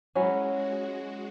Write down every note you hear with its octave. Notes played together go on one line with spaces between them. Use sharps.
F#3 G#3 C#4 E4
F#4
F#4